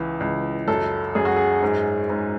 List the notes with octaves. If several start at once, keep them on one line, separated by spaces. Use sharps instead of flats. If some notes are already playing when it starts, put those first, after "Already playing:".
Already playing: C#2 E3
C#2
F#2 A4
F#2 G#4
F#4
G#4
G#2
G#2